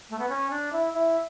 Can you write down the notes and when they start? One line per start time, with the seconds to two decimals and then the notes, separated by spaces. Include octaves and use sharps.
0.10 A3
0.19 B3
0.29 C#4
0.50 D4
0.72 E4
0.94 E4